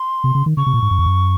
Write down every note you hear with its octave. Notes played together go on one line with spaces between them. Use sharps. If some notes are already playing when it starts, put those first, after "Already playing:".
Already playing: C6
C3
C#3
D#3
C#3 C#6
C3
A#2
G#2
F#2
F2
F#2